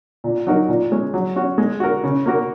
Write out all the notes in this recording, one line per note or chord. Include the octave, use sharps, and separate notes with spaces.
A#2
F#3 D#4 F#4 A#4
A#2
G#3 C#4
F#3
C#4 F#4
G#3
F#4 A#4
C#3
A#3 F#4 A#4